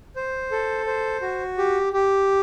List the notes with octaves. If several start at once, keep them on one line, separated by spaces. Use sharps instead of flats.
C5
A4
C5
F#4
G4
G4